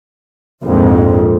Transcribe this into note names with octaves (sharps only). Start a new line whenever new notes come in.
A#1 F2 G#2